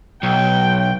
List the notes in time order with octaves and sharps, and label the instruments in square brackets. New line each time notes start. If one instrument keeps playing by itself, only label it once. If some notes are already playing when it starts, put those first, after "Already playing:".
[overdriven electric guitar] B1 [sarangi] G5